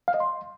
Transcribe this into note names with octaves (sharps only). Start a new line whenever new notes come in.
F5
D#5
C6